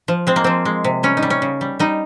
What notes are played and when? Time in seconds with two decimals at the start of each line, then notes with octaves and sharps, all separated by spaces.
0.08 F3
0.27 G#3 C4
0.36 A#3
0.44 F3 C4
0.65 G#3
0.84 C3
1.03 G3 C#4
1.17 D#4
1.22 G3
1.30 C#4
1.42 C#3
1.61 G3
1.79 G3 D#4